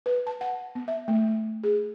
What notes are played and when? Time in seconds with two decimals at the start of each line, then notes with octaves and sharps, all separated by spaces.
0.06 B4
0.27 A5
0.41 F#5
0.75 B3
0.88 E5
1.08 A3
1.64 G#4